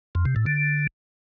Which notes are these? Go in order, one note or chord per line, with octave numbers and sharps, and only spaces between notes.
F2
C3
A2
D3